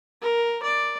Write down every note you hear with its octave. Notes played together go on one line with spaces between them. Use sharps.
A#4
D5